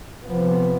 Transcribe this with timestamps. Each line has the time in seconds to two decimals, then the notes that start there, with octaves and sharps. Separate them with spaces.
0.25 C3 F3 B3